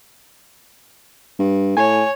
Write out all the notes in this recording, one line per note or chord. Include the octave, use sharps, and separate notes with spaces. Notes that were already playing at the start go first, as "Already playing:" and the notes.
G2
A2 C#5 G#5